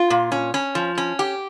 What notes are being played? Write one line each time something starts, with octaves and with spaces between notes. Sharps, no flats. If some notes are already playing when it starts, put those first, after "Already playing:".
Already playing: F4
A#2
C#4
C#4
F3
C#4
G4